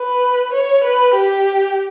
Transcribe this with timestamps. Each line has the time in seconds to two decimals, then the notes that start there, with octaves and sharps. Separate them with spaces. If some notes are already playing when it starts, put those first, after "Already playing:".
Already playing: B4
0.53 C#5
0.84 B4
1.14 G4